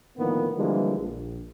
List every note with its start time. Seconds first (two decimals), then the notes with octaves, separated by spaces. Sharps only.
0.18 A2 D3 D#3 F3 A#3 B3
0.57 D3 E3 F3 G3 G#3 A#3
0.98 A#1